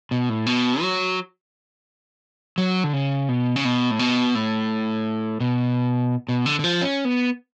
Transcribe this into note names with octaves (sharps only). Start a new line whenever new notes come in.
B2
A2
B2
F#3
F#3
D3
C#3
B2
C#3
B2
A2
B2
A2
B2
B2
D3
D3
F3
C#4
B3